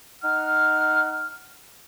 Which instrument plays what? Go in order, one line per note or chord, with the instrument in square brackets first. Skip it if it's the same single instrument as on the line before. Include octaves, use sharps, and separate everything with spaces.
[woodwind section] D#4 F#5 F6